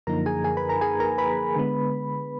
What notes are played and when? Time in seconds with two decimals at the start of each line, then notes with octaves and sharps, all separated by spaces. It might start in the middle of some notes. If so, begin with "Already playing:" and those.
0.07 F#2 D3 F3 A#3 D#4 A#4 A#5
0.26 G#4 G#5
0.44 G#4 G#5
0.57 B4 B5
0.69 A#4 A#5
0.81 G#4 G#5
1.00 A#4 A#5
1.18 B4 B5
1.56 D3 G#3 B3